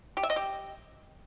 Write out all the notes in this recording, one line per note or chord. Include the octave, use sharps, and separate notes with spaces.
G4
E5
D#5
G4